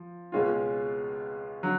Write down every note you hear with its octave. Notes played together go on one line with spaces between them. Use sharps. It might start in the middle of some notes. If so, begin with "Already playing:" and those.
Already playing: F3
C#2 B2 G#3 C#4 F4
D3 F#3